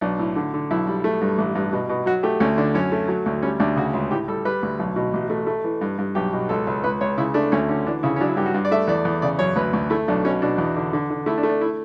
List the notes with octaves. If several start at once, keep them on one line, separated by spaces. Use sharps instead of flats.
B1 D4
A2
D3
D3
B1 E4
G3
A3
G2
A1
G2
B2
B2
F#3 F#4
A3 G4
D2 C#4
D3 D4
F#2 C#4
A3
F#3
D2
G3 C#4
D2 D4
C#3 F#4
C#2
A2 G4
G3 A4
G3 B4
D2
B1
B2
A1
A3
A3
E3
G2
G2
B1 G4
B2
C#2 A4
C#2
C#2 B4
C#2 C#5
C#3 E4
A3 D4
D2 C#4
D3 C#4
E3 D4
C#3 E4
C#4
F#3 D4
E4
G2 G4
F#4
G2
D5
A3 E5
E2 D5
E2
C#3 D5
F#2 C#5
D2 B4
D2
A3 E4
B1 D4
B2 C#4
B2 D4
E2
D3
D3
D3
A3 E4
D4
A3
D4
E4